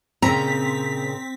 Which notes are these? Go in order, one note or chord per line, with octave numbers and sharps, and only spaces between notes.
A#2 C#3 C4 A#5 B6